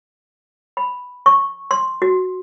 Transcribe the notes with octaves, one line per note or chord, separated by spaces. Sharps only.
B5
C#6
C6
F#4